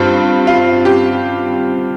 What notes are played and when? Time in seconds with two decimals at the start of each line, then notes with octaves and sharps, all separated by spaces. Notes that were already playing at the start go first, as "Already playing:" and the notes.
Already playing: G2 G3 C4 F4
0.47 F4
0.85 G4